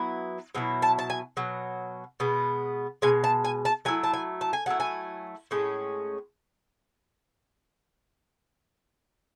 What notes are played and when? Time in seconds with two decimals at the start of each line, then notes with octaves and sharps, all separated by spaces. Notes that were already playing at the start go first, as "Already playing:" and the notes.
Already playing: F#3 B3 E4
0.55 B2 F#3 E4
0.82 A5
0.99 A5
1.10 G#5
1.37 B2 F#3
2.20 B2 G#3 B3
3.02 B2 G#3 G#5
3.24 A5
3.44 G#5
3.65 A5
3.85 F#3 A3 E4 G#5
4.03 A5
4.13 G#5
4.41 A5
4.53 G#5
4.66 F#3 A3 E4 F#5
4.80 G#5
5.51 A2 G#3 C#4